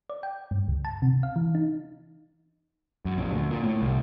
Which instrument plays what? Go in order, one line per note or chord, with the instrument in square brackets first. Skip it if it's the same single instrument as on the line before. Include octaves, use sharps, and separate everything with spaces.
[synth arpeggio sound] D5
G5
G2
C#2
A5
C3
F5
E3
D#4
[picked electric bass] F#2
A#1
D2
A#2
A2
C2